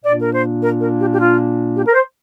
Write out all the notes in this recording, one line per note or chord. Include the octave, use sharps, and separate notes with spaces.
A#2 A#3 D4 D5
A#4
C5
A#4
A#4
G4
G4
F4
G4
A#4
C5